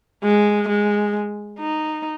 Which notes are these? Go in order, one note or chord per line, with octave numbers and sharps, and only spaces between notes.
G#3
G#3
D#4